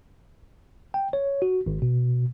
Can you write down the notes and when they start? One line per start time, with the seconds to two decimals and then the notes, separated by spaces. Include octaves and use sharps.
0.94 G5
1.13 C#5
1.42 F#4
1.66 G#1
1.82 B2